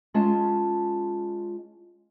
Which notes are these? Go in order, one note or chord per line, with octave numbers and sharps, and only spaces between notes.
G#3 C#4 F4 A5